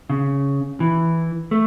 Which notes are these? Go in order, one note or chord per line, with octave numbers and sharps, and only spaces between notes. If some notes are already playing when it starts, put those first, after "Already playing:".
C#3
E3
A3